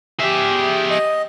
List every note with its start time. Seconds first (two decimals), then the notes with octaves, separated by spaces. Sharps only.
0.20 G4 G#4 E5
0.90 D#5